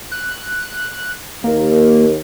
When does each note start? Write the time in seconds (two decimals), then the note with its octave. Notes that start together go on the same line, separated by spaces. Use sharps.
0.12 F#6
1.44 D#2 A#3